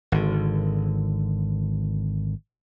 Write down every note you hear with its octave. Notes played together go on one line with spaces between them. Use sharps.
G#1 D3